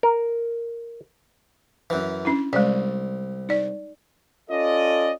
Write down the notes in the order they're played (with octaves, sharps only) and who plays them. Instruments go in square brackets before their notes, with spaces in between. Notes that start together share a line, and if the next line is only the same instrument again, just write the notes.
[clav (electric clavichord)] A#4
[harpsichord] F#2 E3
[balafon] C#4 D4 E4
[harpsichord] C2 [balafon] G#3 D5
[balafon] D#4 D5
[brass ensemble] C#4 F4 A4 D5 D#5